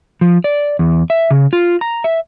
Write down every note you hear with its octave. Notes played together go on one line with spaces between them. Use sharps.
F3
D5
E2
E5
C#3
F4
A#5
E5